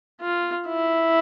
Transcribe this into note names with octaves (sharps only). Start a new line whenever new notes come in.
F4
E4